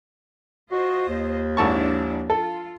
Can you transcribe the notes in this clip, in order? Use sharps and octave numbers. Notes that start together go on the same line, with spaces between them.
F4 F#4 C5 D#5
D#2
G#1 F3 D4 E4 A5 C#6
F4 A4